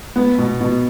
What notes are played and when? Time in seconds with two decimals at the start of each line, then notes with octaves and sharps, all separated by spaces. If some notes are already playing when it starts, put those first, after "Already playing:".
0.16 B3
0.38 B2
0.61 B2